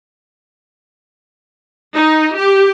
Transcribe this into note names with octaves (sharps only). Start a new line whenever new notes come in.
D#4
G4